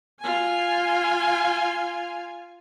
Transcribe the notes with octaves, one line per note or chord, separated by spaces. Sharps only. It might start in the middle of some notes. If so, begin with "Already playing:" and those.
F4 G#5